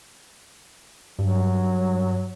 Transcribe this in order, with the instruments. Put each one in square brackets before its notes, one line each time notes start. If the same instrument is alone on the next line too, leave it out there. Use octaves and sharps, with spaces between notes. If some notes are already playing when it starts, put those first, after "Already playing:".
[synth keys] G2 [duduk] F#3